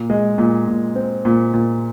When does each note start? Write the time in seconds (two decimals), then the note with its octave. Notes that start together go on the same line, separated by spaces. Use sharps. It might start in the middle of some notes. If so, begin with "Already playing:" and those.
Already playing: A#2
0.10 G#3
0.38 A#2
0.68 A#2
0.96 C4
1.25 A#2
1.54 A#2